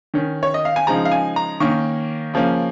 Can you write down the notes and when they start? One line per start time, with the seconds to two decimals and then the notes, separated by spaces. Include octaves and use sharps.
0.14 D#3 C#4
0.43 C#5
0.54 D#5
0.65 F5
0.76 G#5
0.87 C#3 F3 G#3 D#4 A#5
1.05 F5
1.12 G#5
1.36 A#5
1.60 D#3 A#3 C#4 C#6
2.34 C#3 F3 A#3 C#4